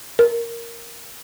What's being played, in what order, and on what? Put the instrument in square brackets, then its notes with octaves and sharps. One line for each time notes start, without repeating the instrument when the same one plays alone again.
[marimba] A#4